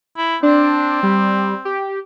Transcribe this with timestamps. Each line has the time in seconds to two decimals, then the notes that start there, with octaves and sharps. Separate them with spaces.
0.17 E4
0.43 C4 D4
1.03 G3
1.65 G4